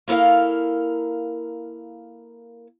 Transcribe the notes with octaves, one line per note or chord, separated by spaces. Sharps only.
A#3 E4 A4 A#4 F5